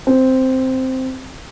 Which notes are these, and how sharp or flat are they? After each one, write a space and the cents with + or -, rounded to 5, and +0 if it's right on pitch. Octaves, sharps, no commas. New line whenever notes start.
C4 -5